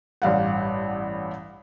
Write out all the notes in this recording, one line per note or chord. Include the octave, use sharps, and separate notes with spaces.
A1 G2 F5 F#5